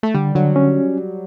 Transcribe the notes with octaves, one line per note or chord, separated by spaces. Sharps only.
A3
D3 G3
D3 F#3
C#4